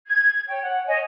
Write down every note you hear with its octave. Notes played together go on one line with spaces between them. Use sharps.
G#6
C#5 G5
F#5
C#5 D#5 G#5